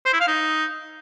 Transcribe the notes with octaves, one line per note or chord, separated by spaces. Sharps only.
C5
E4
F5
D#4